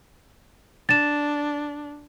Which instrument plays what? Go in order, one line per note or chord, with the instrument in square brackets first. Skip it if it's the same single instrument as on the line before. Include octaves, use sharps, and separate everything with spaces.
[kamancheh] D4 [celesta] A6 E7